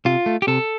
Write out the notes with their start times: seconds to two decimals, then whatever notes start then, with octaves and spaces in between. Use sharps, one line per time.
0.05 C3 F4
0.26 A3
0.42 G4
0.47 C3 A4